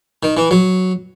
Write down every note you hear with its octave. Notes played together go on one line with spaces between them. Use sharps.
D#3
E3
F#3